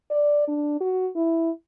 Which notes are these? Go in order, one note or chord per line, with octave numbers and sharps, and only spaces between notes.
D5
D4
F#4
E4